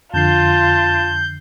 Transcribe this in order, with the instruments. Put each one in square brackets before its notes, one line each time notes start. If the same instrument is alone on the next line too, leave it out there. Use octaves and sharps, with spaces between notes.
[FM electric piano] F2 D3 C7 [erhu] F4 [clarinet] A5 [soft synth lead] G6